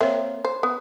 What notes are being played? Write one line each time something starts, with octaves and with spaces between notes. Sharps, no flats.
A#3 C4 C#5 E5
C5
B3